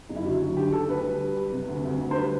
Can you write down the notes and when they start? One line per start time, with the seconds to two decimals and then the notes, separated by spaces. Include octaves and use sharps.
0.09 F#1
0.16 E4
0.25 D3 F#4
0.41 F#3 F#4
0.57 D3 G4
0.72 D3 A4
0.88 D2 B4
1.05 G3
1.22 G3
1.36 G3
1.52 C3
1.68 D2
1.85 D2
2.01 D2
2.11 C5
2.16 G3 B4